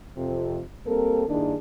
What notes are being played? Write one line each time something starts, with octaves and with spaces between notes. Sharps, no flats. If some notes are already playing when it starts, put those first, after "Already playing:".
F2 C3 F4
G3 A#3 C4 A4 A#4
G2 D#3 A#3 D4 E4 G#4